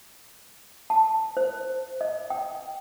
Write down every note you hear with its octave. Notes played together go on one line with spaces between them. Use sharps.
A5
C5
D#5
G5